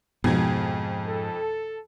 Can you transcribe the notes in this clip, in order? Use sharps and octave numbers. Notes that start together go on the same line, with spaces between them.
F2 G#2 B2 F3 D#4 G#6
A4